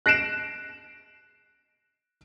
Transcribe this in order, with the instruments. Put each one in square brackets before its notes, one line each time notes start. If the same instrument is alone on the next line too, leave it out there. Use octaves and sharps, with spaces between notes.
[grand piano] F#6 A#6 C7 D7 E7